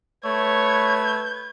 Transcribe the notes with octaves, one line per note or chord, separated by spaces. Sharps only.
A3 B4 C#5 G#6